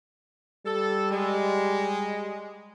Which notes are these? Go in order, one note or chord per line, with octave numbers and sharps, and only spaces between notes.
G3 A4
G#3